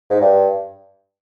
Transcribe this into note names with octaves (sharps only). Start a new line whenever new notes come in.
G#2
G2